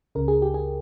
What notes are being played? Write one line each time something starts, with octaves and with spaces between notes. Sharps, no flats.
C#2 C#3 A#4
G#4
G4
G#4